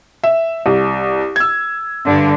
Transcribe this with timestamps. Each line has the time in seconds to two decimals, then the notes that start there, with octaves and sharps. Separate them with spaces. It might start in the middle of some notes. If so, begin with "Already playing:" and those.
0.24 E5
0.66 C2
1.36 E6 G#6
2.05 G2 D3